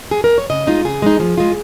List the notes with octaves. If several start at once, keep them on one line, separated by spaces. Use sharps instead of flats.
G#4
A#4
C#5
C#3 D#5
G#3 D#4 F4
C#3 G#4
G#3 D#4
F3
G#3 F4